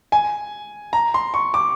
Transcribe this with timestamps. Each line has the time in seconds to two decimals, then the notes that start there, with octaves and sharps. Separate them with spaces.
0.12 G#5
0.93 A#5
1.14 C6
1.34 C#6
1.54 D6